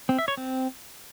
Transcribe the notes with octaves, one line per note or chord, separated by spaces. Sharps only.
C4
E5
C#5
C4